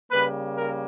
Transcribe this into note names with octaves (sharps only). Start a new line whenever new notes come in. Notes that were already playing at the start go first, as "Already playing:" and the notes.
C#3 G3 A#3 B4
A#4